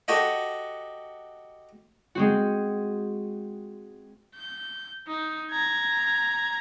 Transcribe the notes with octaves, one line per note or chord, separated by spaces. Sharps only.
F#4 G4 A4 D#5
G#3 C4 F#4
G6
D#4
A#5 G#6